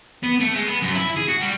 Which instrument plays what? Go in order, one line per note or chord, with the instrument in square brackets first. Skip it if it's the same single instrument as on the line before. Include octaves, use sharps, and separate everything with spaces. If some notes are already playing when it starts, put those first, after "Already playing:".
[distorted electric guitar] B3
A3
G#3
B3
F#2
E4
G#4
F#4
G3